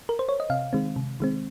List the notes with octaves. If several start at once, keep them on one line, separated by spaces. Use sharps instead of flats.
A#4
C5
C#5
D#5
C3 F5
D#3 G#3 C4
C3
D#3 G#3 C4